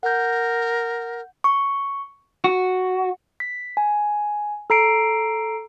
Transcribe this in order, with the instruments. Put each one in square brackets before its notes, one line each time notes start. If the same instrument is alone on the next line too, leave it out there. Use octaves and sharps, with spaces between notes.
[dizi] A#4 [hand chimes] F#5 G6
[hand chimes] C#6
[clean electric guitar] F#4
[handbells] B6
G#5
A4 A#5 C7 D7